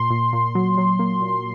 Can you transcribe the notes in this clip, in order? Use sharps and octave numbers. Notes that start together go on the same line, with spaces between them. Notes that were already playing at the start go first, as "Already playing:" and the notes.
Already playing: A#2 C6
A#2
A#2
F#3
F#3
A#3
A#2